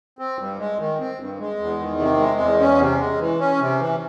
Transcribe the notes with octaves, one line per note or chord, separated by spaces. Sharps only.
C4
G2
G#3
D#3
C4
G2
G#3
E2
D#3
C3
G#3
E2
C#4
C3
G#3
E3
C#4
C3
E3